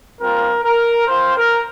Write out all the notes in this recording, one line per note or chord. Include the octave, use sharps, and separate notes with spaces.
G3 C4 F4 A#4
A#4
C4 F4 C5
A#4